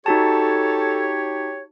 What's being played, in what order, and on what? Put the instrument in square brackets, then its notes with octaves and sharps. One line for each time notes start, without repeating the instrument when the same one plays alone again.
[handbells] D#4 F#4 A5 [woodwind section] G4 C#5 [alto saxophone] A4